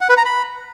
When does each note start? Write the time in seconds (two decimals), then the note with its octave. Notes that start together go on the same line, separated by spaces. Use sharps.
0.01 F#5
0.09 B4
0.17 A#5
0.25 B5